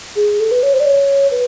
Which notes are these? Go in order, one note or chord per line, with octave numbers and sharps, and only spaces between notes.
G#4
A4
B4
C#5
C5
D5
C#5
B4